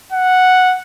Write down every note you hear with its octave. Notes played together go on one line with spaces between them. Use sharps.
F#5